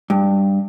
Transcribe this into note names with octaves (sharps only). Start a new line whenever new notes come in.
G2